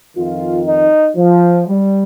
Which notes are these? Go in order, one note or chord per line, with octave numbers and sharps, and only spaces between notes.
F2 D#3 F4
D#4
F3
G3